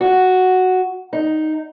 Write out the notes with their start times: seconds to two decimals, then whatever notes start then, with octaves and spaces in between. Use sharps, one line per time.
0.01 F#4
1.13 D#4